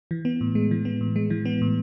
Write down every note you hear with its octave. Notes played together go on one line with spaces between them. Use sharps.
E3
B3
A2
G#3
E3
B3
A2
G#3
E3
B3
A2